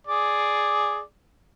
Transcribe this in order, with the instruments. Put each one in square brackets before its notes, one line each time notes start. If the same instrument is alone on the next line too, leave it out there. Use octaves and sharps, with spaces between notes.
[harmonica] G#4 D5